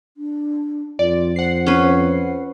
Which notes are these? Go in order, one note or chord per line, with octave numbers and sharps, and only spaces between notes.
D4
F2 F4 D5
C5 F#5 C7
C#4 B4